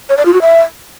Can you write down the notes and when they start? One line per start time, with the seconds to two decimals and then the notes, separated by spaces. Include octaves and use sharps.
0.09 C#5
0.17 D5
0.26 F4
0.34 F#4
0.42 E5